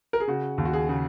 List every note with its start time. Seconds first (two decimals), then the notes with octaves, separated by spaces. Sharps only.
0.13 A#4
0.20 G#4
0.28 C#3 F#4
0.58 D#2
0.65 F#4
0.73 G#4
0.89 C#3